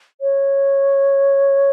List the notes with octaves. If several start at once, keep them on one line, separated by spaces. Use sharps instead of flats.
C#5